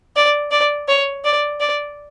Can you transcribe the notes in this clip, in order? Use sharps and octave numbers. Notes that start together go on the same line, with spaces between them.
D5
D5
C#5
D5
D5